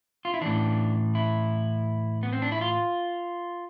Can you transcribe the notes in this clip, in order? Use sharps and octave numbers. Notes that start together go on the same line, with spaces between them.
F4
E4
A2 E3 D4
E4
B3
C4
D4
E4
F4